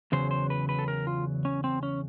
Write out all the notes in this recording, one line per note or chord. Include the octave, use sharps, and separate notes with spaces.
E2 C#3 F#3 C5
C5
B4
B4
A4
A#4
F4
C#4
C4
C#4